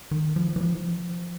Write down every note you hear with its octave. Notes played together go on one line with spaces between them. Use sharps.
D#3
F3
E3
F3